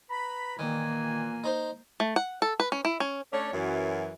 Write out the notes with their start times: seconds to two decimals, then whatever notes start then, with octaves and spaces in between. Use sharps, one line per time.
0.10 B4 A#5 B5
0.59 A#2 D#3 E3 A#3 G#5
1.44 D#4 C5
2.00 A3
2.16 F#5
2.42 A4
2.60 B4
2.72 C#4
2.85 E4
3.00 C#4
3.32 A3 C#4 D4 C#5
3.53 F#2 E3